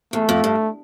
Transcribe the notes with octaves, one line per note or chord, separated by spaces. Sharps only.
E2 A3
F2
G2